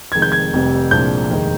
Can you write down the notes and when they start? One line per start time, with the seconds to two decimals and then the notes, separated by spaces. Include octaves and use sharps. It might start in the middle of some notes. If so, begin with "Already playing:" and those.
0.12 F1 F2 D#3 G#3 G#6
0.22 G6
0.32 G#6
0.53 F1 F2 C3 G3
0.91 C2 A#2 F3 G#3 D4 G6
1.30 F1 D#2 D#3 G#3